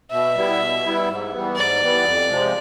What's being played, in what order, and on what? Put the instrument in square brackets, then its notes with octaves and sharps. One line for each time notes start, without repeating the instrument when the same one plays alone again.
[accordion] B2 [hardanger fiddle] E5
[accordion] G3 B3 E4
B2
G3 B3 E4
G#2
E3 G3 B3
[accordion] G#2 [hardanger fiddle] D5
[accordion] E3 G3 B3
F2
C3 F3 G#3